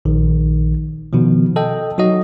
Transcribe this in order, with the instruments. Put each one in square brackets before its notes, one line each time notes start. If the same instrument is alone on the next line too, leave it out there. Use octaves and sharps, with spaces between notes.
[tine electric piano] A#1 D#3
B2 D#3 F3
A4 D#5 G5
F#3 D#4 F#4 D#5